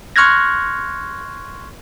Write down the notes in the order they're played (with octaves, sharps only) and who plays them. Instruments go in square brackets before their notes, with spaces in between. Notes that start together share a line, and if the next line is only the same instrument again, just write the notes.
[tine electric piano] C6 C#6 F6 F#6 G#6 A#6